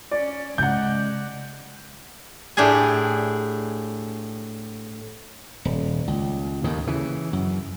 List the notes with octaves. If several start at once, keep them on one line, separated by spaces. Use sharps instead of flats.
C#4 D5
C#3 G#3 D5 F#5 G6
A2 D4 G4 G#4 G#5
D#1
C#2
D#2 A2 D#3
C#3 E3
F#2